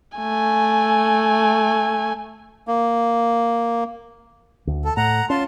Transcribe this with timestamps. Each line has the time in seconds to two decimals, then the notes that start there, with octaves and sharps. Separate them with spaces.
0.18 A3 G#5
2.68 A#3
4.67 D2
4.85 A4
4.97 A2 F#5 A#5
5.30 C#4 F4 A5 C6